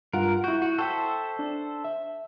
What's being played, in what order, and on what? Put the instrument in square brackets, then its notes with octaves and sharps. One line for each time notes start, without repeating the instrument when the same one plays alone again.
[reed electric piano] G2 F4 F#5 [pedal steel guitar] A#4
[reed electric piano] E4 G6 [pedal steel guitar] F#4
[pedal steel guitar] F#4
[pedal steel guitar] A4 C5 E5 [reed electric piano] G5 C#6
[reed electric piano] D4
E5